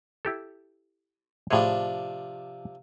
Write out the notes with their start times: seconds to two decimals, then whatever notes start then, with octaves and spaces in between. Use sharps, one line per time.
0.25 E4 G4 A4
1.51 A2 C3 F3 D4 G#4 C#5